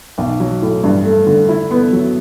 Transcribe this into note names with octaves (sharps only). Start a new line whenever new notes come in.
B1
F#3
A2
G2
A3
D3
E4
B3
F#3